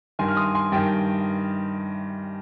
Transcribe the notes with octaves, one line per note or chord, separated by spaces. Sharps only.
G2 D#3 G#5 C6
F6
C6 D#6
G#5 C6
G2 D#3 G5